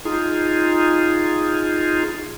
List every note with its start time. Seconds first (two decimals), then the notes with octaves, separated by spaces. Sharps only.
0.05 D#4 F4 G#4